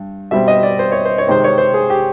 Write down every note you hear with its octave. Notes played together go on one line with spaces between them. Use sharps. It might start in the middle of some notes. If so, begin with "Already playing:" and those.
Already playing: G2
B2 G3 C4 E5
D#5
D5
C5
C#5
C5
C#5
C3 D#3 G#3 C4 C5
C#5
C5
G#4
G4